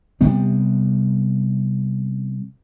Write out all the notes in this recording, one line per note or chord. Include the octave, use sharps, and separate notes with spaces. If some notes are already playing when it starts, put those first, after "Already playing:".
C3 G3 B3 C4